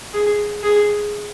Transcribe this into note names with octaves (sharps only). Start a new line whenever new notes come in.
G#4
G#4